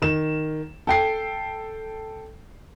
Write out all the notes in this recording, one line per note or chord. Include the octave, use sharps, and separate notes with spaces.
D#3 E7
A4 G5 C7